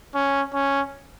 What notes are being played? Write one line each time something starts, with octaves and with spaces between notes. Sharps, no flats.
C#4
C#4